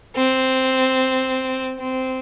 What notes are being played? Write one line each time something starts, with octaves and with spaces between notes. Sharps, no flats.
C4
C4